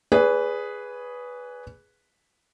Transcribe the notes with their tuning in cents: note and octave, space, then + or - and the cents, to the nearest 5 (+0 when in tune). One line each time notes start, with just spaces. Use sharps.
G#4 +0 B4 +0 D5 -45